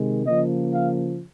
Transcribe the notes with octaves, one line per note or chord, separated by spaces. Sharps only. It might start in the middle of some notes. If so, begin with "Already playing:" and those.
Already playing: C3 D#3 G#3
C#3 F3 A#3 D#5
F5